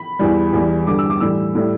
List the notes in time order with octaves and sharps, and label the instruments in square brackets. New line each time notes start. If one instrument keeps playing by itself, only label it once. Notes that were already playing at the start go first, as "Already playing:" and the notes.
Already playing: [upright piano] B5
E2 E3 G3
E2 E3 G3
G2 D3 G3 D6
E6
D6
A2 E3 G3 E6
A2 G3